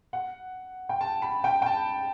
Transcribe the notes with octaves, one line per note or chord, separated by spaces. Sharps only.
F#5
G5
A5
B5
G5
G5
A5